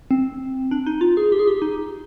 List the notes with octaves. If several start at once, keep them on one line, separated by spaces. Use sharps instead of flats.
C4
D4
D#4
F4
G#4
G4
G#4
G4
D#4